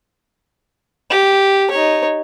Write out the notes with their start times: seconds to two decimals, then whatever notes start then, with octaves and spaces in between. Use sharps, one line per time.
1.11 G4
1.71 D#4 C#5